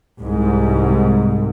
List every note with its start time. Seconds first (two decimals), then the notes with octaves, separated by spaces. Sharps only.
0.21 C2 G#2